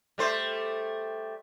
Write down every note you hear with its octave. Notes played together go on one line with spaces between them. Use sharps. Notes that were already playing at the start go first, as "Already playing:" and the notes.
G3 A3 C5